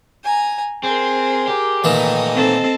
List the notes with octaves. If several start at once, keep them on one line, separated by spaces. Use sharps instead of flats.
G#5 A#5
C4 G#4 A#4
G4
A#2 D#3 E3 A3 D#4 D#5
C4 A4 C5